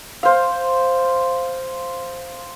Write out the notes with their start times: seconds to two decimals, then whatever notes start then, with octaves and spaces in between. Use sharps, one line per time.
0.23 C5 F5